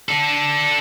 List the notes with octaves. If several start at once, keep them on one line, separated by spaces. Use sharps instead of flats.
D4 A4